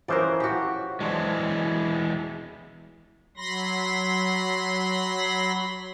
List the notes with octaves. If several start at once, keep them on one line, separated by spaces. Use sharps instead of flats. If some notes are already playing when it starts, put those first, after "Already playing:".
E3 F3 C#4 A#4 C5 D5
F#4 G4
E3 F#3 G#3 D4 C5
F#3 B5 C6 A#6